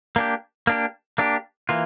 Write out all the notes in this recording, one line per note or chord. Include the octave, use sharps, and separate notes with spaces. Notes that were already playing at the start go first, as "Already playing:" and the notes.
A#3 D4 G4
A#3 D4 G4
A#3 D4 G4
E3 A#3 F4